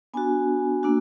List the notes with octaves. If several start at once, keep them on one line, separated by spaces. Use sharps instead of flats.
B3 D4 F#4 G#5
A#3 D4 F#4